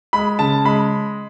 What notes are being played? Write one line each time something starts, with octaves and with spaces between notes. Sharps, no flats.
G#3 B5
C#3 A5
G#3 B5